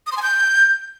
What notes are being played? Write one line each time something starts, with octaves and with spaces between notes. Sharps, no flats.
D#6
C6
G#5
G6